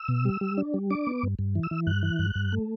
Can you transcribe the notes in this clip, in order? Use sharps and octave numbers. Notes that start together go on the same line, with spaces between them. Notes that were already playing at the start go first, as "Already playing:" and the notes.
Already playing: E6
B2
G3
G3
D4
G3
D4 D6
B3
G2
G2
E3
E6
E3
G2 F#6
E3
G2
G2
A3